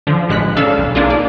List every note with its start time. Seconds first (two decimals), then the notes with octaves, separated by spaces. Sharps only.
0.07 D3 F3
0.29 A1 G#3 F#6 B6
0.57 C#3 D4 A4 F5 E6
0.78 B1
0.95 A#3 D4 D#4 F4 G#4
1.10 D5